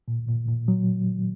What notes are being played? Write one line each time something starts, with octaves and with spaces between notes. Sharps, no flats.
A#2
A#2
A#2
F#3